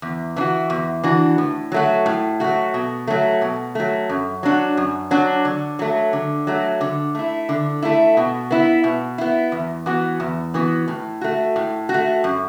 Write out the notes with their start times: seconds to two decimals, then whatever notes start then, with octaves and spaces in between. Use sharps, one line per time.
0.02 E2
0.36 E3 D4
0.41 F#4
0.70 E2
1.03 E3 D4 F#4
1.38 A2
1.72 F#3 A3 F#4
2.06 A2
2.40 F#3 A3 F#4
2.74 B2
3.07 F#3 A3
3.42 B2
3.75 F#3 A3
4.09 F#2
4.43 F#3 D4 F#4
4.77 F#2
5.11 F#3 D4 F#4
5.45 D3
5.79 F#3 A3
6.13 D3
6.47 F#3 A3
6.81 D3
7.15 A3 E4
7.49 D3
7.82 A3 E4
8.17 B2
8.51 B3 E4
8.84 B2
9.18 B3 E4
9.52 E2
9.86 E3 B3 F#4
10.20 E2
10.54 E3 B3 F#4
10.88 A2
11.21 A3 F#4
11.56 A2
11.89 F#4
11.94 A3
12.24 F#2